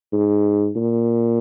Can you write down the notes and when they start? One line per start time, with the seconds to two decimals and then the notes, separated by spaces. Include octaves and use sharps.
0.13 G#2
0.76 A#2